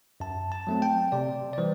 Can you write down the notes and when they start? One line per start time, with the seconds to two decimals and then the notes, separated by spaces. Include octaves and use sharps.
0.20 F#2 A5
0.52 A5
0.67 F#3 A3 C4
0.82 G5
1.12 C3 D5
1.53 D5
1.58 E3 G3 C5